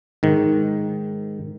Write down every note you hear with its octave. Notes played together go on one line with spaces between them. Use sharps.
G#2 D#3